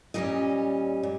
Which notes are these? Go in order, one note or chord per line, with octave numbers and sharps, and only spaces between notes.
A#2 G3 C#4 D#5
A#2